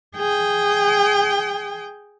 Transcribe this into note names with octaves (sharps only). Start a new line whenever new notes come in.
G#4 G5